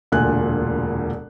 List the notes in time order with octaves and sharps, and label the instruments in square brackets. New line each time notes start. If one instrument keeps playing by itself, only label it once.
[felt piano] E1 D2 A#2 G#5 F#6